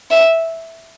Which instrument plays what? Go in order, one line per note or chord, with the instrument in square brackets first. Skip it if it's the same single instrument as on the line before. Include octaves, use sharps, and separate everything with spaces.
[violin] E5